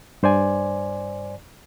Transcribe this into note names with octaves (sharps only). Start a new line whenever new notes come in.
G2 C5 D5 G#5